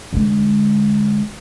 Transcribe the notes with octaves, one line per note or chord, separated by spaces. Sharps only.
D3 G#3